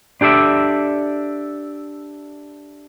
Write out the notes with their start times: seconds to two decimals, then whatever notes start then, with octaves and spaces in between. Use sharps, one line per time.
0.21 D4 G4 A4 D5 E5